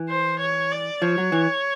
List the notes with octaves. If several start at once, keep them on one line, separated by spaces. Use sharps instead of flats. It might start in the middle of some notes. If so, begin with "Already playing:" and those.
Already playing: E3
C5
C#5
D5
F3 C#5
F#3
E3